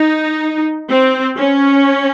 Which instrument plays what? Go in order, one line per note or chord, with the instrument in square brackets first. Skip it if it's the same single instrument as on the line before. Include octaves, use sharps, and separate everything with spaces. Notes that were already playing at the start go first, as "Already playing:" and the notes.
Already playing: [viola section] D#4
C4
C#4